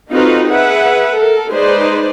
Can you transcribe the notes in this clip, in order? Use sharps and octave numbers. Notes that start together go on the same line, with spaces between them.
C4 D#4 F4 F#4 A4 B4
G#4 B4 E5 F#5
A4 A#4
G#3 D#4 G#4 B4 C5 D5